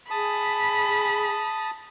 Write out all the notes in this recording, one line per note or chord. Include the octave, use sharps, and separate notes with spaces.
G#4 A5 B5 D#6